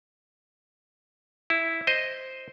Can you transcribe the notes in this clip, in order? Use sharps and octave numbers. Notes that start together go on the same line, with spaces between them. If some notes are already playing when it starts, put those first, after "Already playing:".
E4
C5 D#5